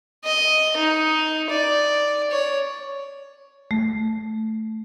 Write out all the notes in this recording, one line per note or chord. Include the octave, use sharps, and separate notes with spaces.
D#5
D#4
D5
C#5
A3